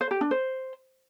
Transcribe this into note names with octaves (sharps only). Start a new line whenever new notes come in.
C5
G4
D4
C5